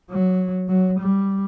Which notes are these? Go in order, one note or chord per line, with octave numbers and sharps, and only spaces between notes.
F#3
F#3
G3